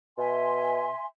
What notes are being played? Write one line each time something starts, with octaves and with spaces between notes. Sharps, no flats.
B2 E5 G#5 C6